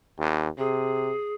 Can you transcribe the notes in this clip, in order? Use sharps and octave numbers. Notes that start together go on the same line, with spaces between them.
D#2
C3 G#4